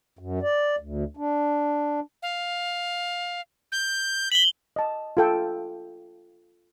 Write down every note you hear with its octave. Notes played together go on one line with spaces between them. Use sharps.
F#2
D5
D2
D4
F5
G6
B6 F#7 G7
D#5 A5
F4 A4 G5